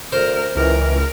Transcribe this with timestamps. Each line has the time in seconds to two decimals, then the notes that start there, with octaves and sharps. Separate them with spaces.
0.12 D2 A#4 C5
0.56 C#2 E3 A#4